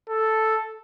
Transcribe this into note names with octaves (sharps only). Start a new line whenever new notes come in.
A4